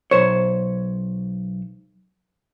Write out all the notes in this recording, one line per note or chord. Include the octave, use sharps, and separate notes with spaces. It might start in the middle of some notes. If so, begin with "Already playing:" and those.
B1 C5 C#5